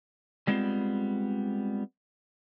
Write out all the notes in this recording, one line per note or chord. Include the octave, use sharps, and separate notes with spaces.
G3 G#3 B3 C4 D#4 F4